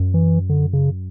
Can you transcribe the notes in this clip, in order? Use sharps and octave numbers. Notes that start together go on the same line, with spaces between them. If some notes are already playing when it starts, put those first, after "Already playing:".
Already playing: F#2
E3
D3
C#3